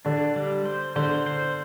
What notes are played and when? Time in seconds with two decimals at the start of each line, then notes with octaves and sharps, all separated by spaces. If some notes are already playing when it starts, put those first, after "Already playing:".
0.05 D3 D4
0.36 G3
0.65 C5
0.96 D3 C5
1.26 C5